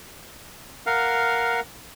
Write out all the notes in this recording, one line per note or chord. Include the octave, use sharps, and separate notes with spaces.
A#4 F5 F#5